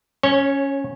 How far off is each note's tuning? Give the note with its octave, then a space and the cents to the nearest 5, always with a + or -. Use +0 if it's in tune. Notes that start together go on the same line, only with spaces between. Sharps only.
C#4 +0 C#5 -20